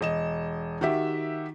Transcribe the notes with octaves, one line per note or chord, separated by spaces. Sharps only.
E1 D#5 E7
D#3 F#4 G4 E5